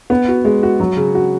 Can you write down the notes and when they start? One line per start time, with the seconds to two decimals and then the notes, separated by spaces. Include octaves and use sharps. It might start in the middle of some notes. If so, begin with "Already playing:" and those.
0.10 B3
0.28 F#4
0.45 G#3
0.63 F#4
0.80 F#3
0.97 C#3
1.15 F#4